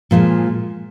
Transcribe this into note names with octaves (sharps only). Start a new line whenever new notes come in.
A#2 F3 G#3